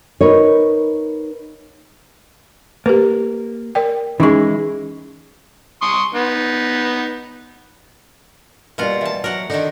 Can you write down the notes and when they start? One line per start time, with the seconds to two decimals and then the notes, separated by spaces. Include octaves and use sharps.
0.21 D#4 A#4 B4 C#5
2.86 A#3 G4 B4
3.75 A#4 D5 G5
4.20 E3 G#3 C#4 D#4 C#6
5.82 C6 C#6 D#6
6.15 B3 D#4
8.78 B2 G3 A#3 F4 F#5
9.01 E3 A5
9.24 F#3 A#4 F#5
9.50 D3 D#3 D#4